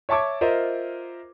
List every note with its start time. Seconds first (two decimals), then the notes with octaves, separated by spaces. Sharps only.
0.09 C#5 E5 A5 C#6 D6 G#6
0.41 F4 A#4 C5 D#5 E5